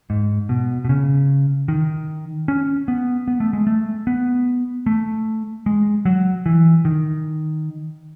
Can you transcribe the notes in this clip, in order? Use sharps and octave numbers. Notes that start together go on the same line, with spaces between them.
G#2
B2
B2
C#3
D#3
C#4
B3
B3
A3
G#3
A3
B3
A3
G#3
F#3
E3
D#3